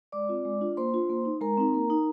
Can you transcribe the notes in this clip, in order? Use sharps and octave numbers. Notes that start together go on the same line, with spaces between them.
G#3 D5 D6
C4 F4
G#3
D4 F4
A#3 C5 C6
D4 F4
A#3
D#4
G#3 A#4 A#5
C4 D#4
A#3
D#4